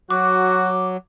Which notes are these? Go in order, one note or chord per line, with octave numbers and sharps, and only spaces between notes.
F#3 F#4 D6